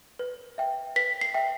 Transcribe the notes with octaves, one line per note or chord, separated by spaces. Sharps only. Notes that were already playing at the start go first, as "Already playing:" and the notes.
B4
E5 G5
B4 B6
C7
E5 G5